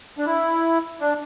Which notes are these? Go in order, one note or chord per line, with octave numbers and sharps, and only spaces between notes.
D4
E4
D4